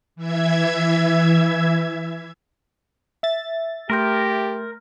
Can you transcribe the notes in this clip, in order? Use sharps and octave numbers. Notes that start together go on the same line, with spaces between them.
E3 E5 G#6
E5 A6
A3 G4 A#4 C6 G6